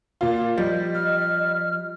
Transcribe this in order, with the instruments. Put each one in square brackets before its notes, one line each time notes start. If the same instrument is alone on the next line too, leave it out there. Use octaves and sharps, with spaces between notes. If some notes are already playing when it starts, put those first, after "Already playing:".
[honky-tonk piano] A#2 F4
[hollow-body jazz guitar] F3 [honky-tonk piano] G3 [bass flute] D#5
[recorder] F6